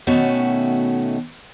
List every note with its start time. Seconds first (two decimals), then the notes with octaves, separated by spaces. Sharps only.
0.07 B2 D#3 A3 C#4 F#4 E5